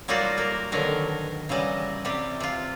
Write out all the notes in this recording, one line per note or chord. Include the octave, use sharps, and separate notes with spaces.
F#3 G3 A#3 D#4 F4 F#4
A#3 A#4
B2 D3 D#3 F#3 A#4
C#3 E3 F#3 G3 D#5
C3 G3 G4
C3 F4